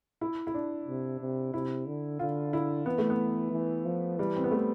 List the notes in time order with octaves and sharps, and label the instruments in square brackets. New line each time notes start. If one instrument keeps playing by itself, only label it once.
[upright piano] E4
E4
D4
[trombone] C3
C3
[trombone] C3 [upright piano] E4
[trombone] D3
[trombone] D3 [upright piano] F4
[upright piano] E4
[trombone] E3 [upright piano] B3
[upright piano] A3
B3
[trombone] E3
F3
[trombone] E3 [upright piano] G3
[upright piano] C4
B3
A3